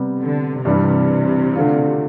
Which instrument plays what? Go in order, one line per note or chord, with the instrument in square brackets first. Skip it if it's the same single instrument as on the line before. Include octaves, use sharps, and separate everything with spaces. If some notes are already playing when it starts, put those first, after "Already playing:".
Already playing: [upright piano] C3 G3 B3
[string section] D3
[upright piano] G2 E3 G3 D4 [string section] C3
[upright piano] D3 A3 D4 F4